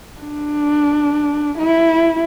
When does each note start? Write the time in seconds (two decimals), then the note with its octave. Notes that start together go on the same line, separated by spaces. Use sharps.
0.20 D4
1.59 E4